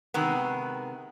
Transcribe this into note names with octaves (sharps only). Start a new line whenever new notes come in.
C3 D#3 G#3 B3